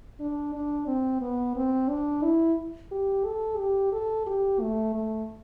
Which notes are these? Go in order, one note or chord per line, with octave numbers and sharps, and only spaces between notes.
D4
D4
C4
B3
C4
D4
E4
G4
A4
G4
A4
G4
A3
A3